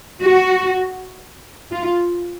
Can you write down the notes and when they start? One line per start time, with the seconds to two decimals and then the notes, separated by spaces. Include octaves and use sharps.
0.21 F#4
1.71 F4